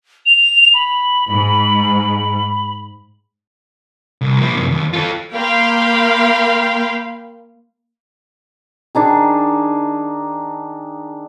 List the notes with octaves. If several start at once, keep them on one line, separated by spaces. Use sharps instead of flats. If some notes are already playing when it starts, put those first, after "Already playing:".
F7
B5
G#2
C2
F3 A#3
F#2 C3
D#2
F4 A4
A#3 A#4 F5 G5 B5 C6
D#3 D4 D#4 G#4